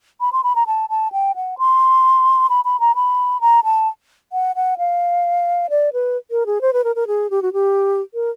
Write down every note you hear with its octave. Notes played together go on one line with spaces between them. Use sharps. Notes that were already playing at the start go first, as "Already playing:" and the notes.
B5
C6
B5
A#5
A5
A5
G5
F#5
C6
B5
B5
A#5
B5
A#5
A5
F#5
F#5
F5
D5
B4
A#4
G#4
C5
B4
A#4
A#4
G#4
G4
F#4
G4
A#4